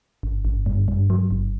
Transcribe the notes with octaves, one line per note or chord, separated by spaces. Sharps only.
G1
G1
G2
G2
F#3
G1